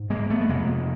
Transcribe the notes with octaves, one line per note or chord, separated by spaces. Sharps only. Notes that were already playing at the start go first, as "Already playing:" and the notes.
Already playing: G#2
G#3 A#3
A3 B3
A3
F2 C3 G#3 A#3